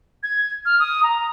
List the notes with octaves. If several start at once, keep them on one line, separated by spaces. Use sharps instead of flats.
G#6
F6
D#6
A#5